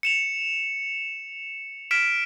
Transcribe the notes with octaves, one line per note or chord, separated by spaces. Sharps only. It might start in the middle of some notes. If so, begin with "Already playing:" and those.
C#7 E7 F7
F6 B6 D7 E7